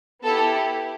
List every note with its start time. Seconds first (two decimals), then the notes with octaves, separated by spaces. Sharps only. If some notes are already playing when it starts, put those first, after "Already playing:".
0.24 B3 E4 G4 A4